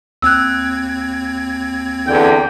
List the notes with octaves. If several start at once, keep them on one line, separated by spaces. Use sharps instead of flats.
D#2 C4 E6 F#6 G#6
E2 D3 G5